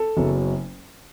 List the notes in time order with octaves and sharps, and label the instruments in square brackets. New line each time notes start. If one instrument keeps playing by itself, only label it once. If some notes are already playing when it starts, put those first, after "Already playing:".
Already playing: [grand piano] A4
F#1 F#2 C#3 F#3 B3